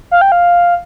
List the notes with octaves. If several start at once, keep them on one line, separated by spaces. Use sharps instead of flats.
F5
G5
F5